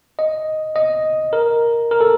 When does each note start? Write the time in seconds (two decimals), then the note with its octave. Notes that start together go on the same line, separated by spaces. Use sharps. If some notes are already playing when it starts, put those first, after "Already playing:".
0.19 D#5
0.76 D#5
1.33 A#4
1.91 A#4
2.01 A4